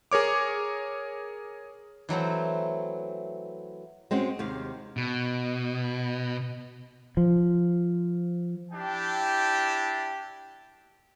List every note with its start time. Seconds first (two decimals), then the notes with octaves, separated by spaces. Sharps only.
0.12 G#4 A#4 C#5 D6
2.09 E3 F#3 A3 C4
4.11 G#3 C4 C#4 F#4
4.39 D#2 C3 F5
4.97 B2
7.17 F3
8.72 D4 E4 G4 G5 A5